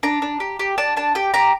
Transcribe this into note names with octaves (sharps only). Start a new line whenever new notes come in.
D4 A#5
D4
G4
G4
D4 A5
D4 A5
G4 G5
G4 A#5